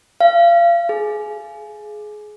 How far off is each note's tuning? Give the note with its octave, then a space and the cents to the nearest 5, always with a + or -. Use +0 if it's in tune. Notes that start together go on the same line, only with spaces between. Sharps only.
F5 -30
G#4 +20